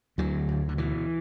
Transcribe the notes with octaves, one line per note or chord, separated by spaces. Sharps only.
D2 D3 F#3
D2
D3
B2 E3